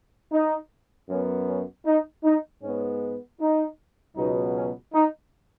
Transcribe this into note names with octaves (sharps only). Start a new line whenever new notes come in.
D#4
F#2 F#3 B3 C#4
C#4
D#4
D#4
G#2 G#3 B3 C#4
D#4
C#2 B2 F#3 B3 D#4
C#4
D#4